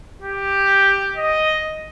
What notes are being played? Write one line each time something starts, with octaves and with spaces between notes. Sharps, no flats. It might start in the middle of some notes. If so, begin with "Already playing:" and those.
G4
D#5